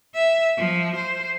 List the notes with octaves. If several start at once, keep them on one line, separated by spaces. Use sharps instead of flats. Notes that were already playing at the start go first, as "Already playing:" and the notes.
E5
F3
C5